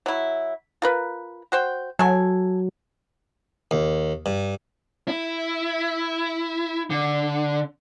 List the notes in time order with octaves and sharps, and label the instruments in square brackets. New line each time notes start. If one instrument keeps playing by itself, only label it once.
[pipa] F#3 E4
F4 A#4 B4
F#4 C5 G5
[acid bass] F#3 [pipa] A4 G#5
[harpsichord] D#2
G2
[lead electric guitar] E4
D3